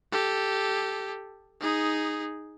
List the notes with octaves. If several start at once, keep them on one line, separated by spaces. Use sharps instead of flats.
G4 A4
D#4 G#4